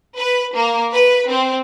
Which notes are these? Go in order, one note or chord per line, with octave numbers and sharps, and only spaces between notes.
B4
A#3
B4
C4